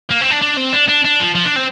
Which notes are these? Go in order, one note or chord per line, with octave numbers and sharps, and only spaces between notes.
A#3
C4
D4
D4
C4
D4
D4
D4
F3
F3
D4
C4